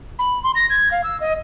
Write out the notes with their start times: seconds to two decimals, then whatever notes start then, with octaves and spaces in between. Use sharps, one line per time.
0.19 B5
0.44 C6
0.55 A#6
0.70 G#6
0.91 F5
1.04 E6
1.20 D#5